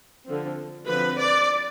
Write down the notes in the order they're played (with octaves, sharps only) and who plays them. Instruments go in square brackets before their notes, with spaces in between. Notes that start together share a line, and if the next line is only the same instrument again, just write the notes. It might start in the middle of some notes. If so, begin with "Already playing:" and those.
[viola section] D3 F3 C4
D3 F3 C4 B4
D5